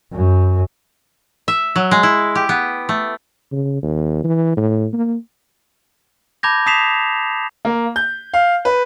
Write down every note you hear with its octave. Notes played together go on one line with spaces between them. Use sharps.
F#2
E5
F#3
G#3
E4
G4
B3
A3
C#3
D#2
E3
A2
A#3
A5 B5 D6 G6 G#6 A#6
A5 D#6 B6 C7 E7 F7
A#3
G6
F5
B4